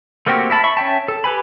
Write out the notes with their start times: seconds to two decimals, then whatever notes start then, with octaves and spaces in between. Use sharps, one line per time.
0.26 A3 A#3 C4 F#4 G4
0.50 E4 E5 A5 B5
0.64 E5 B5 C#6
0.77 C#4 E5 G5 A5
1.08 A4
1.24 G4 B4 G#5 B5